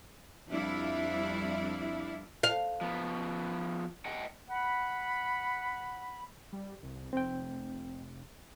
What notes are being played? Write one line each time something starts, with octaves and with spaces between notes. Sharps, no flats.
F2 G3 D4 E4 F5
F5
F3 B3
D#5 F#5 G5
F#5 B5
G3
C2
F1 C4 G5